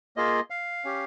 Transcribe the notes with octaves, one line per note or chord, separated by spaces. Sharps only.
A#3 F4 G#4 D#5
F5
C#4 G4